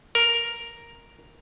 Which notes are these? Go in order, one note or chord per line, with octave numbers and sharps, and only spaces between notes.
A#4